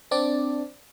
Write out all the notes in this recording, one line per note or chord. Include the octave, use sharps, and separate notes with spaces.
C4 D4 D5